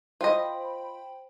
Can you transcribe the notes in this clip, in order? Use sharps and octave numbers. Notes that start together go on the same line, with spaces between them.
F4 C5 D#5 G5 B5